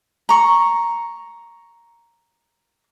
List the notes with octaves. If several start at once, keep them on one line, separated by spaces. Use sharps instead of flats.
A#5 C#6